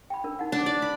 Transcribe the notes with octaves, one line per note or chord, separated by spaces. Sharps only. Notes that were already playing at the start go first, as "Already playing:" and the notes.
G5 B5
D4 A#4
D#4 F#5
D4
D5
B5